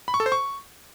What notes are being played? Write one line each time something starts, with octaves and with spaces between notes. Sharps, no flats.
B5
C#6
A4
C5
C#6